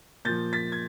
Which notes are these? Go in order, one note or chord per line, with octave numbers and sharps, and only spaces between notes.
A#2 F3 G6 A6
A6 B6
G#6